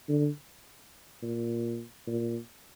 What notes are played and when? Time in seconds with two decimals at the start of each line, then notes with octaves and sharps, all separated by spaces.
0.09 D3
1.22 A#2
2.07 A#2